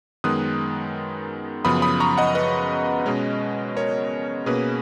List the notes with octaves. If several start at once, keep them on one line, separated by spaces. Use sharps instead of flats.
F#2 D#3 G#3 B3 D#6 F#6
F#2 C#3 F3 B3 B5 D#6
B5 D#6
A#5 C#6
D#5 F#5
B4 D#5
B2 G#3 C#4
A#4 C#5
B2 A#3 C#4 G#4 B4